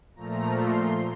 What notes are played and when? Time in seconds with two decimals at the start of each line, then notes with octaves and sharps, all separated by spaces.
0.16 A#2 F3 A3 A#5
0.55 C6